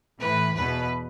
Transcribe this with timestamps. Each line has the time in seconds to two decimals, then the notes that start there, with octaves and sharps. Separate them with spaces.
0.19 A2 E3 B4
0.55 E2 B2 B4